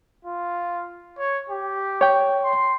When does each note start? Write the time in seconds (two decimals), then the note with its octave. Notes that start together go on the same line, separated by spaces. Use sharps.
0.25 F4
1.18 C#5
1.49 G4
2.01 C#5 G5
2.44 C6